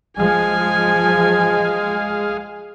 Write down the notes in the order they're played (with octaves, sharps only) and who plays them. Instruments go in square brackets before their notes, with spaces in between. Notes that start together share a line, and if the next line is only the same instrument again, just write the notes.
[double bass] F3 [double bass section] G#3 [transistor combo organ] G#4 F5 [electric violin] G#5